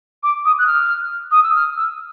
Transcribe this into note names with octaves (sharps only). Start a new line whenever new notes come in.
D6
D#6
F#6
F6
D#6
E6
F6
E6